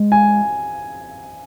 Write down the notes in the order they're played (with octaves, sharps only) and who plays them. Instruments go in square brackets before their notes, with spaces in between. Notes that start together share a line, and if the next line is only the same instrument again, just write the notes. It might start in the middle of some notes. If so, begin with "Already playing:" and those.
Already playing: [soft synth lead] G#3
[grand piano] G#5